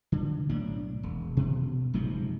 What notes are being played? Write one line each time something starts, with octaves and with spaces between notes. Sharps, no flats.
D3
B1 A2 D4
E1
B2
F#1 G#2 C3 F3